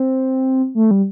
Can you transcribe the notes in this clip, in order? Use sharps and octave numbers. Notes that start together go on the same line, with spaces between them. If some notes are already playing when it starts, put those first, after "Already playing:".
Already playing: C4
A3
G3